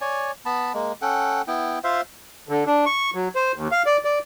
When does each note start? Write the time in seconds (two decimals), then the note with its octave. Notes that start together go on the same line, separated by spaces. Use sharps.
0.01 C#5 D5 G#5
0.46 B3 A5 B5
0.74 G#3 A#3
1.02 C#4 A4 F#5 G5
1.47 B3 E4 G5
1.84 F4 C5 E5 F5
2.49 D3
2.66 D4
2.86 C#6
3.14 F#3
3.35 C5
3.55 D#2
3.72 F5
3.86 D5
4.04 D5